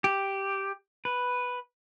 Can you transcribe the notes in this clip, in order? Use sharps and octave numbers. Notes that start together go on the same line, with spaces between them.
G4
B4